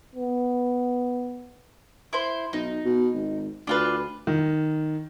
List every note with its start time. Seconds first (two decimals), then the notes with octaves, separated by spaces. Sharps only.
0.15 B3
2.13 E4 C5
2.53 B1 D#4
2.85 B2
3.14 G#1
3.67 D2 D4 F4 B4
4.27 D#3